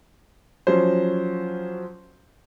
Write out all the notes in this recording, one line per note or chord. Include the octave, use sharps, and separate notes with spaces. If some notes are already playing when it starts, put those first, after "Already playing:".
F3 F#3 C#4 C5